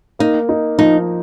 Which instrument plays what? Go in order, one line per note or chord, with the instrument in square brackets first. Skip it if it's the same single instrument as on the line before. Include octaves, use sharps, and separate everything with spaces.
[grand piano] A#3 [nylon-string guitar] D#4
[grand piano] D#4
[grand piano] F3 [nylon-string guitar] D#4